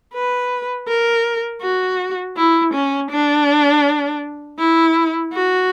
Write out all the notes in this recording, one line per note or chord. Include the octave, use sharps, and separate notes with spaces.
B4
A#4
F#4
E4
C#4
D4
E4
F#4